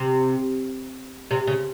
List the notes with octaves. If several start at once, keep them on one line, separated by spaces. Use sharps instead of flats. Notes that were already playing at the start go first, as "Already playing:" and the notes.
Already playing: C3
C3
C#3